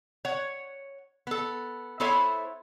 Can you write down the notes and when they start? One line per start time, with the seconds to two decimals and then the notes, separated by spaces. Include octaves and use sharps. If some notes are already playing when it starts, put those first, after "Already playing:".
0.25 C#5 F#5
1.27 B3 A4
2.00 B3 E4 A4 C5 C#5 E5